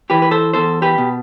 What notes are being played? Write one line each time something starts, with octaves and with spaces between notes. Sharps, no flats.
E3 G4 B4
B4
A4 C5
E2 A4 C5
G4 B4
B2